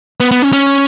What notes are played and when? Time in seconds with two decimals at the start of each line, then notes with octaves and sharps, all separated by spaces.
0.20 B3
0.31 B3
0.42 C#4
0.52 C#4